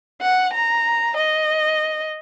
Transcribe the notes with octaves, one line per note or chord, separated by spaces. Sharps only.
F#5
A#5
D#5